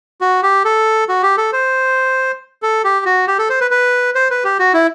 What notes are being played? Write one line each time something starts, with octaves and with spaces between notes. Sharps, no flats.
F#4
G4
A4
F#4
G4
A4
C5
A4
G4
F#4
G4
A4
C5
B4
B4
C5
B4
G4
F#4
E4